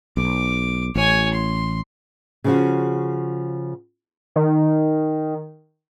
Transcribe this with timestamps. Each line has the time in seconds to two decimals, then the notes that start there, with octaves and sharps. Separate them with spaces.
0.17 B1 D6
0.95 A1 C#5 G#5
1.33 C6
2.44 C#3 F3 F#4
4.36 D#3